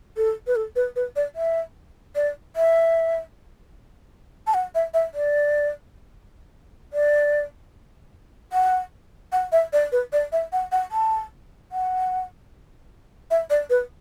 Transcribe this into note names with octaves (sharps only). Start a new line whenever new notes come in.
A4
B4
A4
B4
B4
D5
E5
D5
E5
A5
F#5
E5
E5
D5
D5
F#5
F#5
E5
D5
B4
D5
E5
F#5
F#5
A5
F#5
E5
D5
B4